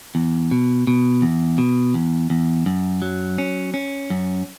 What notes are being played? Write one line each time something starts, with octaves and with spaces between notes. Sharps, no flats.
E2
B2
B2
E2
B2
E2
E2
F#2
F#3
C#4
C#4
F#2